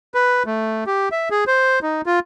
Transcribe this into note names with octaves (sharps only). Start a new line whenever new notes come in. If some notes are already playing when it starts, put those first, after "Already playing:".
B4
A3
G4
E5
G#4
C5
D#4
F4